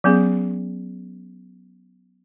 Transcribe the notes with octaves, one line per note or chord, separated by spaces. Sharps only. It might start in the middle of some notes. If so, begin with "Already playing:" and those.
F#3 B3 C#4 G#4